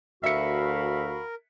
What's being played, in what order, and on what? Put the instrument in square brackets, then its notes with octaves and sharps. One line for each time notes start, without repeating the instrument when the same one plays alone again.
[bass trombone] D2 [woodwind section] F#4 F5 B5 [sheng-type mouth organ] A#4 [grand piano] E5 C#7